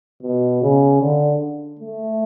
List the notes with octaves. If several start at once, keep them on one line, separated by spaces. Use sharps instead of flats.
B2
C#3
D3
A3